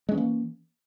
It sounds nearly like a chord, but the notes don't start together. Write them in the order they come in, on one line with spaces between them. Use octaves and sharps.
G#3 C#4 E3 A#3